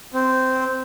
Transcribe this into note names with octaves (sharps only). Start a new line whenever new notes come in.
C4